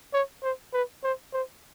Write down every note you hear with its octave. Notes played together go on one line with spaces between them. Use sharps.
C#5
C5
B4
C5
C5